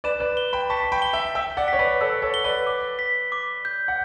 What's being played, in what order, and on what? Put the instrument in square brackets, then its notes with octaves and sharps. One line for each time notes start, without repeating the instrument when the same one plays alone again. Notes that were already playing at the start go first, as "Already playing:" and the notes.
[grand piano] B4 D5 [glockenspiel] E7
[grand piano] B4 D5
[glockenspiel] G7
[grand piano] G5 B5
[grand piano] A5 C#6 [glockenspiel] B6
[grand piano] C#6
G5 B5
[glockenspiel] G7
[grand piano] E5 G5
[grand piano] E5 G5 [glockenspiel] E6
[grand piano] D5 F#5
[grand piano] C#5 [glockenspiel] B6
[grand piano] B4 D5
[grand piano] A4 C#5 [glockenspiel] E6
[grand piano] A4 C#5
[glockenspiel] G7
[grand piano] B4 D5
[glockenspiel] D6
B6
D6
G6
[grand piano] F#5